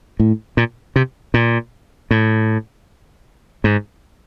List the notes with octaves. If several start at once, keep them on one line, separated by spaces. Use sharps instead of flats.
A2
A#2
C3
A#2
A2
G#2